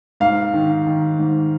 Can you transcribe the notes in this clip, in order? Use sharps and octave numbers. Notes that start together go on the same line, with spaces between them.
G#2 F5
D#3
D#3
G#2